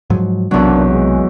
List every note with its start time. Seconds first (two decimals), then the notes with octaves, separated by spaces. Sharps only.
0.10 G#2 F3 F#3
0.51 B1 E2 C3 F#3 A#3 D4
0.90 G#3